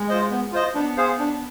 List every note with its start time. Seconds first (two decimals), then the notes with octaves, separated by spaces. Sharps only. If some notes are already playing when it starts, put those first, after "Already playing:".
Already playing: G#3
0.08 F4 C5 D#5
0.30 B3
0.52 F4 C5 D#5
0.74 B3 D4
0.97 G#4 C5 F5
1.19 D4